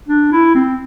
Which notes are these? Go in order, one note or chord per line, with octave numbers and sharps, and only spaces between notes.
D4
E4
C4